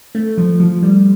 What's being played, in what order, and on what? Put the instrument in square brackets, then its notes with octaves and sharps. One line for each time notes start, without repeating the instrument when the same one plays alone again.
[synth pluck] A3
F3
F3
G3